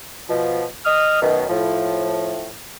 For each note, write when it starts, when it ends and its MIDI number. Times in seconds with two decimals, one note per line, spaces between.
0.30 0.64 47
0.30 0.64 53
0.85 1.20 75
0.85 1.20 87
0.85 1.20 89
1.22 1.45 42
1.22 1.45 47
1.22 1.45 51
1.49 2.51 45
1.49 2.51 53